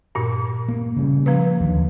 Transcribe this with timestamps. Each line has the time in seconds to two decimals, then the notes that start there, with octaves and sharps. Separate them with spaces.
0.15 G2 A#2
0.68 A#3
0.96 C#3 G3
1.26 F3 A#3 B4
1.61 D#2 D3